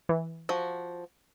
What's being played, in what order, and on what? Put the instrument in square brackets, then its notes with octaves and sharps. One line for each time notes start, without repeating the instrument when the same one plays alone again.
[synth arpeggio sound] E3
[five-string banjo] F3 F#4